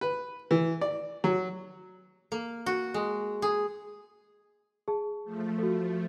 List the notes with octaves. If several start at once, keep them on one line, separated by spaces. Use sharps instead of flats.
B4
E3
D5
F#3
A#3
F#4
G#3
G#4
G#4 A5
F3 A3
F#4 A4